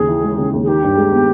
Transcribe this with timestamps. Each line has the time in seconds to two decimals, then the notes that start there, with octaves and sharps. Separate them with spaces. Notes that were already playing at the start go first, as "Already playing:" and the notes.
Already playing: D#2 C#3 G#4
0.08 E3
0.23 G#3
0.38 C#3
0.53 D#2
0.64 G#4
0.67 D#3 G4
0.83 G2
0.97 G#3
1.12 B3